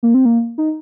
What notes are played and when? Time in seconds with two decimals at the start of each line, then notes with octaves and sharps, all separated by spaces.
0.03 A#3
0.14 C4
0.25 A#3
0.58 D#4